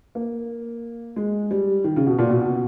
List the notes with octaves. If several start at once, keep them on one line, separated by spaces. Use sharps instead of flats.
A#3
G#3
G3
D#3
C#3
B2
A#2
B2
B2